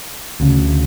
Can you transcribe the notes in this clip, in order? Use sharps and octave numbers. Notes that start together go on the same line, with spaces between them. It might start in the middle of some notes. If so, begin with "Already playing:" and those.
D2 C#3